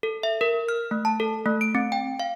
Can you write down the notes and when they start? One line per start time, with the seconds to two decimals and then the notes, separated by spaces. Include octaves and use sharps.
0.03 A4
0.23 E5
0.41 A#4
0.69 F6
0.91 A3
1.05 A5
1.20 A4
1.46 A3
1.61 D7
1.75 C4
1.92 G5
2.20 F5